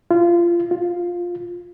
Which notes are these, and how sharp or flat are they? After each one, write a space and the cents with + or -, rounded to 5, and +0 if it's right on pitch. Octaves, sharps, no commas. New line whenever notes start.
F4 -25
F4 +5